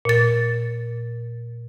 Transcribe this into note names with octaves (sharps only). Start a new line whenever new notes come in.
A#2 A6